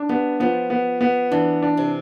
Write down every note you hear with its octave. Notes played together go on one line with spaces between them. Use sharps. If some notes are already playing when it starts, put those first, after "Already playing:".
Already playing: D4
G3 B3
F3 B3
B3
B3
E3 D4
D4
C3